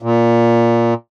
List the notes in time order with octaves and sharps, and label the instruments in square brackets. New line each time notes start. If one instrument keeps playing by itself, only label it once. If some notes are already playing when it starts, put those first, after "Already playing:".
[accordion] A#2